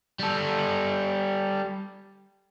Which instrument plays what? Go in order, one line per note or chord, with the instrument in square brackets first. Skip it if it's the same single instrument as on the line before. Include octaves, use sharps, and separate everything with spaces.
[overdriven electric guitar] G3 A4